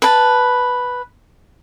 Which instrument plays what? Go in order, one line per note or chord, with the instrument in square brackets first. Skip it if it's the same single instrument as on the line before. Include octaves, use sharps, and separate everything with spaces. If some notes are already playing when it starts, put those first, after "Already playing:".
[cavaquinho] B4 A5